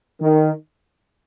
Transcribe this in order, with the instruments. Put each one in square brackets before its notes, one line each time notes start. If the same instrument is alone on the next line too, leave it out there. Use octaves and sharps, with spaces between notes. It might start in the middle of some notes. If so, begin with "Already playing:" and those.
[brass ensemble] D#3